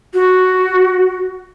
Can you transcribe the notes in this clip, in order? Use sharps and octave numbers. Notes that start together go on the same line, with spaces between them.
F#4